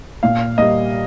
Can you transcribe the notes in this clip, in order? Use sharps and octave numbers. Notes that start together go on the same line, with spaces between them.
A#2 F5
G3 A#3 D#5